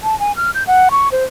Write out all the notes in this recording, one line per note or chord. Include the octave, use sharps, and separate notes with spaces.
A5
G#5
F6
G6
F#5
C#6
C5